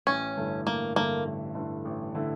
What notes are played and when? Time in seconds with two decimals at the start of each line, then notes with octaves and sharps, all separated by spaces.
0.07 A1 C#4
0.37 G2 D3 A3 E4
0.66 A1 A#3
0.96 G2 D3 A3 A#3 E4
1.26 A1
1.55 G2 D3 A3 E4
1.85 A1
2.15 D3 A3 E4